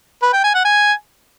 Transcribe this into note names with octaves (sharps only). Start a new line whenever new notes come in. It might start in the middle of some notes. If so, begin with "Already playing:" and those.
B4
G5
G#5
F#5
G#5